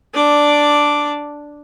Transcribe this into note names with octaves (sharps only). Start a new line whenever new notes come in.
D4 D5